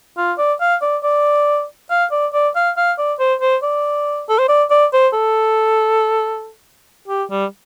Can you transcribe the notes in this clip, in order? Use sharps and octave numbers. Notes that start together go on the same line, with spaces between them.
F4
D5
F5
D5
D5
F5
D5
D5
F5
F5
D5
C5
C5
D5
A4
C5
D5
D5
C5
A4
G4
G3